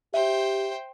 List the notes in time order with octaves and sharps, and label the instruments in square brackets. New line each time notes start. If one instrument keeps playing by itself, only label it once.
[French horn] G4 [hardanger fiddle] C5 G5 [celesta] E5